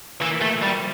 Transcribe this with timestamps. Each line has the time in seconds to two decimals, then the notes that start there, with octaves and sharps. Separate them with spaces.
0.21 E3 A#3
0.41 A3
0.52 F3
0.62 G3
0.67 D3